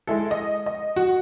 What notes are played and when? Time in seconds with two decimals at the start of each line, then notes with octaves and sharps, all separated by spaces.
0.07 G#3 E4 A4
0.31 D#5
0.66 D#5
0.96 F#4